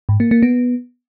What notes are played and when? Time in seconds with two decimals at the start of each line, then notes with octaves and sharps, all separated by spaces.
0.09 G#2
0.20 A#3
0.31 A#3
0.43 B3